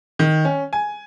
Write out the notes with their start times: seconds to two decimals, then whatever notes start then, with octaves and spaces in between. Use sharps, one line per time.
0.19 D#3
0.45 C#4
0.73 G#5